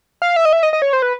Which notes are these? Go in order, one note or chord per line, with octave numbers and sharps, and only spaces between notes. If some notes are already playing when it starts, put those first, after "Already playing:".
F5
E5
D#5
E5
D#5
D#5
C#5
C5
B4